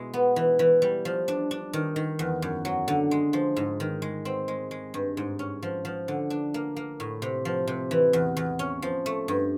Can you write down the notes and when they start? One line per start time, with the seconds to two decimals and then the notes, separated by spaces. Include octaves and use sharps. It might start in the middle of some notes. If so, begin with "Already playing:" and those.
Already playing: B2 G#3 E4
0.14 B3
0.36 E3
0.59 E3
0.82 G3
1.05 F3
1.28 D4
1.51 D4
1.73 D#3
1.96 D#3
2.19 E2
2.42 F#2
2.65 F#3
2.88 D3
3.11 G#3
3.33 F3
3.56 G#2
3.80 D#3
4.02 G#3
4.25 C4
4.48 G#3
4.71 G#3
4.94 G2
5.17 G#2
5.39 C#4
5.63 F3
5.85 F3
6.08 D3
6.30 D4
6.54 A#3
6.76 A#3
7.00 A2
7.22 C3
7.45 F3
7.67 C3
7.91 E3
8.13 E2
8.37 E2
8.59 C#4
8.82 F3
9.06 A3
9.28 G2